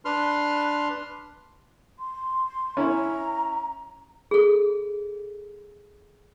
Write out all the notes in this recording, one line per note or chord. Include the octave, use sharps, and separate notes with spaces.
D4 B4 C6 F6
C6
C#4 E4 A#5
G#4 A4